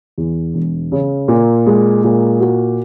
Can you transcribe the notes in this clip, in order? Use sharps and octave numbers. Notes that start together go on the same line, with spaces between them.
E2
E1
C#3
A#2
G#3
A#2
F#4